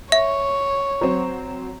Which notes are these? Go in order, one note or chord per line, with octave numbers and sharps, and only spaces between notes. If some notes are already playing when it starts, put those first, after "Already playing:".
C#5 E5
F#3 C4